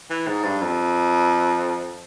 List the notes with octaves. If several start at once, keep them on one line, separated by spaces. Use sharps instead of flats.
E3
G#2
G2
F2